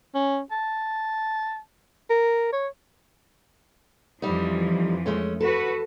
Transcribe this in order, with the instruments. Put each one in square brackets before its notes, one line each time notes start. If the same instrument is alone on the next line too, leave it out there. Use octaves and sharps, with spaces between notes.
[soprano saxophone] C#4
A5
A#4
C#5
[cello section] F2 E3 F3 [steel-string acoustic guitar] G3 D#4
[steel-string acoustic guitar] G#3 A3 C#4
[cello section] F#4 B4 [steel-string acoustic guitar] A4